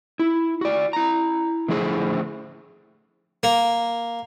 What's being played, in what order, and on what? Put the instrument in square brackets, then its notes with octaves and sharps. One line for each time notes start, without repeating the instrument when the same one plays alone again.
[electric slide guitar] E4
F#4 D5
E4 A#5
D3 F3 A3 E4 G#4 C5
[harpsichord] A#3